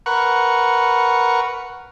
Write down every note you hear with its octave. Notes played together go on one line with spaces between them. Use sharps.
A#4 B4 F#5 C#6